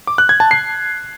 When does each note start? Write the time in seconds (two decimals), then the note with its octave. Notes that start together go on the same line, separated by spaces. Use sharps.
0.07 D6
0.18 F#6
0.29 G#6
0.40 A5
0.51 C7